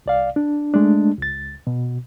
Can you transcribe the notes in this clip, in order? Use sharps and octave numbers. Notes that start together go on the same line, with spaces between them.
C2 D5 F5
D4
G#3 A3 D4
C#2 A6
B2